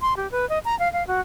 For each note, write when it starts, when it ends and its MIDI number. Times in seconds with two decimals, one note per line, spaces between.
0.01 0.16 84
0.17 0.30 67
0.32 0.48 71
0.49 0.59 75
0.65 0.78 82
0.79 0.92 77
0.93 1.06 77
1.07 1.21 66